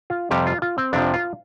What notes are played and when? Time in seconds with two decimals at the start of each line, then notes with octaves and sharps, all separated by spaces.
0.10 F4
0.31 F2 C3 G3 G4
0.47 F4
0.62 F4
0.78 C4
0.93 F2 C3 F3 D4
1.14 F4